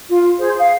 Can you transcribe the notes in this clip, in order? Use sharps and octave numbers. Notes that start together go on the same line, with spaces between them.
F4
G#4 C5
F5